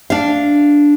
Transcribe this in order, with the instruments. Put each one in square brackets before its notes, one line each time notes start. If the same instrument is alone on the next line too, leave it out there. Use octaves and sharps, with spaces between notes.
[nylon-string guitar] D4 F5